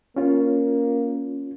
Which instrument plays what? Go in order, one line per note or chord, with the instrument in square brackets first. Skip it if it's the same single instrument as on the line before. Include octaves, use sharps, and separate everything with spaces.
[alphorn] A#3 [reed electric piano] C#4 F4